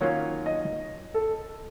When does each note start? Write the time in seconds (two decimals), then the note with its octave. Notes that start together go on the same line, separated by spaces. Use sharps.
0.01 D#3 F#3 A#3 C#4 F4 C#5
0.46 D#5
1.14 A4